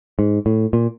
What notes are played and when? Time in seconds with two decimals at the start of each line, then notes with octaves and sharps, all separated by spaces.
0.19 G#2
0.46 A2
0.73 A#2